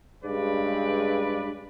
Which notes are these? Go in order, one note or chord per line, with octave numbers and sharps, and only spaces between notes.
G2 C#3 G#3 B4 D5